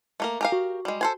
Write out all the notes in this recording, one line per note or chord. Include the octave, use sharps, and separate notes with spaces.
A3 A#3 A#4
G4 A#4 F5 G#5
F#4
G3 G#3
A4 C5 G#5